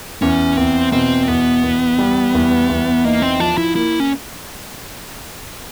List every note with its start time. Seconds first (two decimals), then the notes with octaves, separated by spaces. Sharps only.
0.22 E2 C#4
0.57 E2 C4
0.92 B2 C4
1.28 E2 B3
1.63 E2
1.99 G3
2.34 E2
2.69 E2
3.05 A#3 D#4
3.22 C4
3.40 F3 D4
3.58 E4
3.76 A#3 E4
4.00 C#4